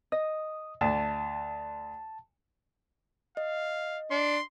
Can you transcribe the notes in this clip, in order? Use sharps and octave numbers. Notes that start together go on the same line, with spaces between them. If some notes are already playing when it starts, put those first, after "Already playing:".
D#5 D#6
D2 A5
D#5 F5
D4 C6